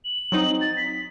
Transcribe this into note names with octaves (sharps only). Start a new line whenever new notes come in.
F#7
F#3 C4 D#4
A6
B6